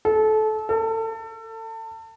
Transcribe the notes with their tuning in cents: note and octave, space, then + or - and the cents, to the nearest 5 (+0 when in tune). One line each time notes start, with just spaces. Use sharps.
A4 -25
A4 +30